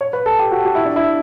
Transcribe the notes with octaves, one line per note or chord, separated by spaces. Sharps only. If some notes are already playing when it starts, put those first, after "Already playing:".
C#5
B4
A4
G4
F#4
F#4
E4
D4
E4